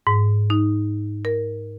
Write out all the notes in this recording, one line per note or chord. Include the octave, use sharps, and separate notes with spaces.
G#2
D#4
A#4